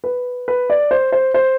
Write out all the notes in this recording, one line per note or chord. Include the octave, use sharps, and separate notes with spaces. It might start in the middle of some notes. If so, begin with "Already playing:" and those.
B4
B4
D5
C5
C5
C5